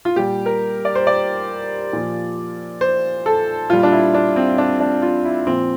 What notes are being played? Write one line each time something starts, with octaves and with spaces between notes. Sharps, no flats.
F4
A#2 G3 G4
A#4
D5
C5
D5
A#2 F3
C5
A4
A#2 G3 F4
D4
E4
D4
C4
D4
D4
F4
E4
A#2 F3 C4